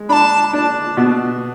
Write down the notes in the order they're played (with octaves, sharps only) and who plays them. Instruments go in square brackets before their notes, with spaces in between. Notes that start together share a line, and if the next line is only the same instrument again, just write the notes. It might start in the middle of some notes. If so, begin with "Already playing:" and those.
Already playing: [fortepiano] G#3
[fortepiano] D4 [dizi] B5
[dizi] A5
[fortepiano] D4
B2